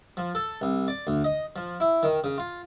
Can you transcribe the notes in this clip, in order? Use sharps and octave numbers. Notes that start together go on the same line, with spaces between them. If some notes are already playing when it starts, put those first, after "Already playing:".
F3
A4
C2
D5
D2
D#5
F3
E4
D#3
C#3
F4